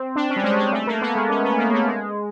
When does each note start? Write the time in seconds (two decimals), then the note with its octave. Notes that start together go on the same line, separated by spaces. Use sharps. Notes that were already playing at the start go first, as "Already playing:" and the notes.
Already playing: C4
0.16 D4
0.30 C#4
0.36 G3
0.43 G#3
0.58 G#3
0.72 A3
0.87 A#3
1.01 B3
1.15 G#3
1.30 C#4
1.44 B3
1.58 A#3
1.73 A3
1.87 G#3